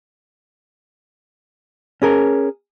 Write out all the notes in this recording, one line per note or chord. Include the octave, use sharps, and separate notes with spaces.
C#4 G#4 A#4